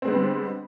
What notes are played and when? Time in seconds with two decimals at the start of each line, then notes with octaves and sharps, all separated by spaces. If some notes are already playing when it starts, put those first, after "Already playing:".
0.02 C4
0.05 G#3
0.08 B3
0.11 D3
0.14 G3